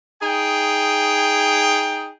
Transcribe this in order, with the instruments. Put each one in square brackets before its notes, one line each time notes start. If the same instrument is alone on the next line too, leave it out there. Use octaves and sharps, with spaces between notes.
[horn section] D#4 G#4 G5